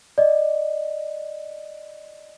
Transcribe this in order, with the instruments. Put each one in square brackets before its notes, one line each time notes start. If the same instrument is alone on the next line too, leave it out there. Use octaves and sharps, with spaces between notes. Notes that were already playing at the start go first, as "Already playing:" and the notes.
[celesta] D5 D#5